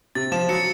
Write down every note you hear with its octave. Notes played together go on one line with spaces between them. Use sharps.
C3 A6
F3 E7
F#3 C#7